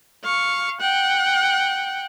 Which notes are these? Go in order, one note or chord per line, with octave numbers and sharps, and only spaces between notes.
F5 C#6
F#5 G5